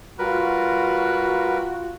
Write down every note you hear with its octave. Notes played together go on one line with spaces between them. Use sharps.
G3 F4 F#4 A#4 B4